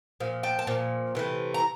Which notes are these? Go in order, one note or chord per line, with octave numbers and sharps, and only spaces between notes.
A#2 F3
G5 A5
A5
A#2 F3
C3 E3 A3
A#5